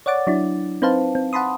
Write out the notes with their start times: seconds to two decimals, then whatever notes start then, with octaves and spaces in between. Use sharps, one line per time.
0.06 C#5 D5 F#5 D6 A6
0.27 F#3 D4 E4
0.82 C4 D#4 B4 C5 F5 A5
1.15 C4
1.33 F#5 A5 B5 C6 D#6